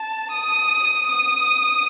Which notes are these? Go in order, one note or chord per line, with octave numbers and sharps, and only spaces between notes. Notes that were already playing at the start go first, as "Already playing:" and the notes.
Already playing: A5
D#6
D#6